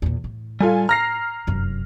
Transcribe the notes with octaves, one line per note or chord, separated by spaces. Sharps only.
E2 A#2
A2
G3 F4 A4 G#5
A#5 F6 A#6 C7
F1 F#2